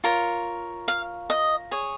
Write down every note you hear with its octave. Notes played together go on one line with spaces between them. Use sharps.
F4 A#4 C#5
F5
D#5
G#4 C#5